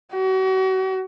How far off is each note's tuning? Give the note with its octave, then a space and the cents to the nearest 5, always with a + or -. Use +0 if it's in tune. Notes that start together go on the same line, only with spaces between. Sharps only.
F#4 +35